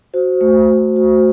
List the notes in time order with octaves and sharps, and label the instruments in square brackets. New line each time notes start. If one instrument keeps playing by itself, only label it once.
[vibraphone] F#4 C5
A3 C5
F#4
F#4